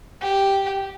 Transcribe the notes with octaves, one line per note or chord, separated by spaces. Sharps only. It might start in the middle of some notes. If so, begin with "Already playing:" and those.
G4